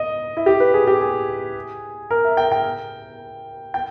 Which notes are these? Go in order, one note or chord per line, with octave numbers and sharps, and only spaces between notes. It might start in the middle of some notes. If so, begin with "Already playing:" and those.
Already playing: D#5
E4
G4
B4
G#4
G4
G#4
A#4
E5
G5
G5
G5